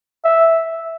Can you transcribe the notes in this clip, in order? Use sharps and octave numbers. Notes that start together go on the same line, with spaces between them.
E5